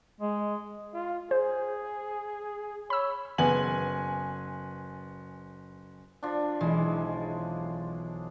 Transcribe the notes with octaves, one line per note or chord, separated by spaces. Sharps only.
G#3
F4
G#4 C5
C#5 B5 E6
F#1 B3 G#5 F#7
F3 D4
B1 E3 G#3 G#4